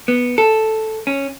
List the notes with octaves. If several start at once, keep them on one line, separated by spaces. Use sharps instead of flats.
B3
A4
C#4